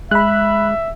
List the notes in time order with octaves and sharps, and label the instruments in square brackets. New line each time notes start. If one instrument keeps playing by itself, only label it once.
[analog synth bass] G#3 [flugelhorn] E5 [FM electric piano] B5 F#6